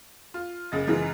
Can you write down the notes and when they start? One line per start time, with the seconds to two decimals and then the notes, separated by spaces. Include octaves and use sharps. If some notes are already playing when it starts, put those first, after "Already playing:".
0.34 F4
0.72 F#1 C#3 D#5 A6
0.87 F#2 C#3 E3 G#3